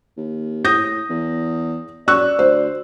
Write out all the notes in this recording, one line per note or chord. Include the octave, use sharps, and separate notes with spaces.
D#2
A2 D#6 G6 A#6
E2
F#2 D5 C#6 E6 F#6
D2 C5